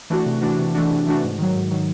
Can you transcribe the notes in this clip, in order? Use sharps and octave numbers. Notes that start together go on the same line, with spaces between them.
E3 A3 D4 F#4
C3
E3 A3 D4 F#4
C3
E3 A3 D4 F#4
C3
E3 A3 D4 F#4
G#2
D#3 F#3
G#2
D#3 F#3